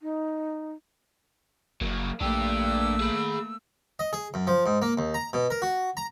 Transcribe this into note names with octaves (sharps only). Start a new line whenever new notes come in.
D#4
F#1 F#3 A#3
A#1 A3 A#3 D4 G4 E6
G#4 B5
D#5
G#4
F#2
F3
G#2
A#3
D#2
A#5
B2
A#4
F#4
A#5